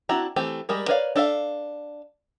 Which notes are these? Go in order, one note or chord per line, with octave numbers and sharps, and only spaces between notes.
C4 D4 E4 F#4 A#5
E3 A3 C4 G4
G3 G#3 A#4
A#4 B4 C#5 D5 F5
D4 A4 E5 F5